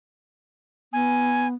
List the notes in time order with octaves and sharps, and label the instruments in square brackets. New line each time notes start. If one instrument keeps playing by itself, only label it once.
[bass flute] B3 [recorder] G#5